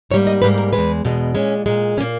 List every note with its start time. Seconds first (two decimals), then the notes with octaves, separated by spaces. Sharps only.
0.11 G#2 G3 A#3 C#5
0.27 D#5
0.42 G#2 G3 A#3 B4
0.58 A#4
0.73 B2 G#3 B4
0.78 E2
1.05 E2 B2 G#3
1.35 A#2 G#3 C#4
1.66 A#2 G#3
1.97 A#2 C#4
2.01 A#3